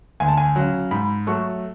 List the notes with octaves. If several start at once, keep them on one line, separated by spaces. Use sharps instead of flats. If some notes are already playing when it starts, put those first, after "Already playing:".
D2 G#5
A5
G#5
C#3 F#3
G#2 B5
F#3 A3 C#6